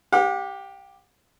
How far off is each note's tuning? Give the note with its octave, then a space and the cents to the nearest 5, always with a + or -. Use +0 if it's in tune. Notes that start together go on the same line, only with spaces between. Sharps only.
G4 +0 F#5 -45